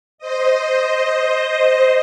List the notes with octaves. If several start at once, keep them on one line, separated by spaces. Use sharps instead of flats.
C5 D#5